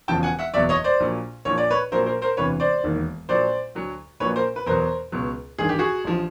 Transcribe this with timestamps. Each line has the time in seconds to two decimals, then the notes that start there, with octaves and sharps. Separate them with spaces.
0.08 E1 E2 C#3 F3 G5 A5
0.23 F#5 G#5
0.39 E5 F#5
0.54 F#1 E2 B2 F#3 D5 E5
0.69 C#5 D#5
0.84 C5 D5
1.00 A#1 A#2 F#3
1.45 A#1 A#2 F3 C#5
1.58 D5
1.71 B4 C#5
1.92 A#1 A#2 F#3 A#4 C5
2.06 A#4 C5
2.22 A#4 C5
2.37 E1 D2 C3 E3 B4 C#5
2.60 C5 D5
2.84 E1 D#2 D#3
3.29 A#1 A#2 F#3 C5 D5
3.75 D2 D3 F#3
4.20 A#1 A#2 F#3 B4 C#5
4.36 A#4 C5
4.56 B4
4.66 E2 B2 F#3 A#4 C5
5.12 C#2 B2 F#3
5.58 A1 G2 D#3 G#4
5.69 G4
5.79 F#4 G#4
6.04 A1 D3 F3